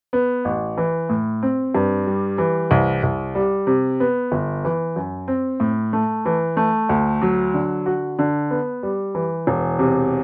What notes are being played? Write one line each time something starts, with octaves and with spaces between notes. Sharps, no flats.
B3
A1
E3
A2
C4
G2
G3
E3
C2
C2
G3
C3
B3
G1
E3
F#2
C4
A2
A3
E3
A3
D2
F#3
D3
F#4
D3
B3
G3
E3
E1
C3